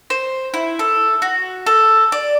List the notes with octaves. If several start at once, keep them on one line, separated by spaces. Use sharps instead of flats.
C5
E4
A4
F#4
A4
D5